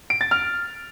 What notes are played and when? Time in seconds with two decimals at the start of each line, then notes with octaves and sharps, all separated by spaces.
0.10 D7
0.21 A6
0.31 F6